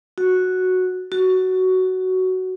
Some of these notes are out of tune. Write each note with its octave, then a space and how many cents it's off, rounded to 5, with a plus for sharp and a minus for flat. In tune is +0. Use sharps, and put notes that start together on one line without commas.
F#4 -5
F#4 +10